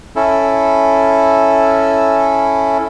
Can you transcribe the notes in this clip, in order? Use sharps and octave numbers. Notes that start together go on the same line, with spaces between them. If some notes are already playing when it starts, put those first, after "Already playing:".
C#4 E4 A4